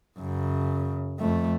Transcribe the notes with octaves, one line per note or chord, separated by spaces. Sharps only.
F#2 C#3
F2 A3